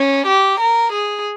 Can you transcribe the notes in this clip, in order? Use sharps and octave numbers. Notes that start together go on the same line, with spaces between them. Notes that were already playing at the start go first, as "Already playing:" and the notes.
Already playing: C#4
G4
A#4
G#4